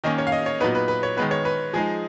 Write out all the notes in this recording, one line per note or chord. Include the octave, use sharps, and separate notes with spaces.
D#3 A#3 C#4 D#5
C#5
F5
D#5
C#5
A#2 F#3 B3 D#4 B4
B4
B4
C#5
D#3 G#3 B3 B4
C#5
B4
F3 G#3 D#4 G#4